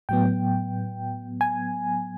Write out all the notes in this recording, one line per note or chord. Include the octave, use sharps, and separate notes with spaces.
A2 F#3 B3 G5
G#5